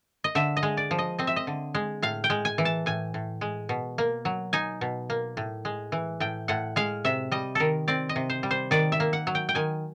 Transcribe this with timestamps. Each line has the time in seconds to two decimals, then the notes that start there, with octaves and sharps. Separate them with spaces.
0.24 D#5
0.35 D3 E5
0.57 D#5
0.63 G#3
0.77 D5
0.91 F3
0.98 D#5
1.18 C4 D#5
1.27 E5
1.36 D#5
1.47 D3
1.75 G#3
2.02 A2 F5
2.24 G5
2.30 G#3
2.45 G#5
2.58 E3
2.65 A5
2.86 A2 G#5
3.14 A2
3.41 G#3
3.69 B2
3.98 A#3
4.25 F#3
4.53 D#4 G#5
4.81 B2
5.10 A#3
5.37 A2
5.65 G#3
5.92 E3
6.20 A2 G5
6.48 A2 F#5
6.76 G#3 F5
7.05 C3 E5
7.32 G3 D#5
7.55 D#3 A4 A#4
7.88 C4 D5
8.09 D#5
8.16 C3
8.30 C5
8.43 G3
8.51 C5
8.71 D#3 D5
8.92 E5
9.00 A#3
9.13 F#5
9.27 F#3
9.35 G5
9.49 G5
9.55 D#3 G#5